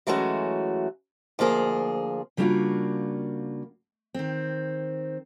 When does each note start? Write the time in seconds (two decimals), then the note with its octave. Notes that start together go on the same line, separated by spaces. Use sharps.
0.07 E3 F#3 G#3 A3 C#4 F#4
1.39 D2 F3 A#3 G#4
2.37 C#3 G3 A#3 D4 F4 F#4
4.14 D#3 C4